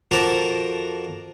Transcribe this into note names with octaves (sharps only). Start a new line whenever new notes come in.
F2 F#4 A#4 A5 A#5 D6